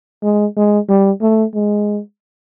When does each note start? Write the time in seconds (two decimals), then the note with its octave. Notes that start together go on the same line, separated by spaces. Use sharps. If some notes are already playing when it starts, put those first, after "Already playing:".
0.23 G#3
0.56 G#3
0.88 G3
1.21 A3
1.54 G#3